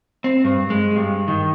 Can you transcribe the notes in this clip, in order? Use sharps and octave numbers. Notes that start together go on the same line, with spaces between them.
C4
G2
G#3
G2
D#3